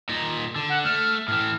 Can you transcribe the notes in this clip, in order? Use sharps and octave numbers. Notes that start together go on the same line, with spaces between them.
A#2 D#4
D3
F#5
A3 F6
A2 E3 F6